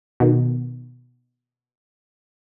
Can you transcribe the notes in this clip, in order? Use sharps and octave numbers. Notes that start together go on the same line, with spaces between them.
B2 D#3